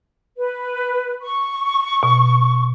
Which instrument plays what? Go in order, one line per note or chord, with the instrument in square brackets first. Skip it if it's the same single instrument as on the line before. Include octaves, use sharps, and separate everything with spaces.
[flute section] B4
C#6
[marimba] B2